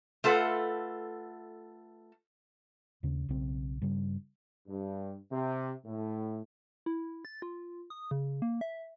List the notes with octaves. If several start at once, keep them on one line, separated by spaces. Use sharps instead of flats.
A3 F4 A4 B4 F#5
D#2 C#3
B1 C#3 C4
G2 C#3 G3
G2
C3
A2
E4
A6
F4
D#6
C#3
A#3
E5